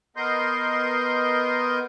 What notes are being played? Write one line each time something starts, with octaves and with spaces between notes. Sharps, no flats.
B3 A#4 D#5 C6 G6